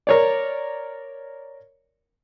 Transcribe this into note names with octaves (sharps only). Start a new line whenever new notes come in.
A#4 C#5 D5